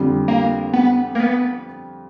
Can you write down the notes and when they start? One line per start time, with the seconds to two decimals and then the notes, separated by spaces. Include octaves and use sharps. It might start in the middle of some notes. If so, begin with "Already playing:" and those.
Already playing: F2 D3 G3
0.28 A#3
0.73 B3
1.15 A#3
1.20 B3